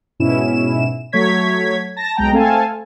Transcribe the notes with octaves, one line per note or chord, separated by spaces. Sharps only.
G#2 B2 C#4 E4 E7
F#3 A3 C#5 G#6 B6
A5 A#6
B1 G#3 G5 A#5
A3 C4 A4 F5 G#5 A5